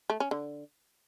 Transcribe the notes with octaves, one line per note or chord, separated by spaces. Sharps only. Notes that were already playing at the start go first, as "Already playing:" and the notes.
A3
C#4
D3